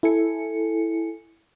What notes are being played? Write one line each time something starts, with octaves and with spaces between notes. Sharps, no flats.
E4 A4 G#5 C#7